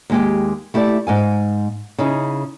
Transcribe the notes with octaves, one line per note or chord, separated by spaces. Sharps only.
D#2 G#3 G4
A3 E4 G4 D5 A5
G#2 F5 G#5
C#3 C#4 D#4 E4